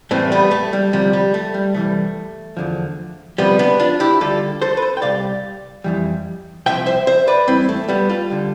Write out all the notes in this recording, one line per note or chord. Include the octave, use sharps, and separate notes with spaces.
A2 E3 G3 A3 C4
G3 B3
A3
G3
D2 C3 F3 G3
G3
A3
G3
C2 C3 E3 G3 A3
E2 D3 F3
D2 C3 F3 G3 B3
B3 D4
D4 F4
E4 G4
D2 D3 G3 F4 A4
A4 C5
B4
A4 C5
G5
C2 C3 G3 D5 F5
F2 E3 G3
C2 C3 F3 E5 G5
C5 E5
C5 E5
B4 D5
E2 B2 G3 C4 E4
A3
G3 B3
F4 A4
D3 G3